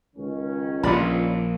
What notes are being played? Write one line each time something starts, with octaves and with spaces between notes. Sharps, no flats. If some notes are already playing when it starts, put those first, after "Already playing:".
C#2 D#3 C#4
A#1 A#2 F4 D5 B5